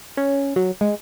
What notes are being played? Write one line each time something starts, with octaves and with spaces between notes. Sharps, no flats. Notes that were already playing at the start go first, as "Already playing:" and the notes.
C#4
F#3
G#3